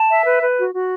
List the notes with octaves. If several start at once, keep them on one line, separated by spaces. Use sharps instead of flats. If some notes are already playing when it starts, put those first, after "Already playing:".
Already playing: A5
E5
B4
B4
F#4
F#4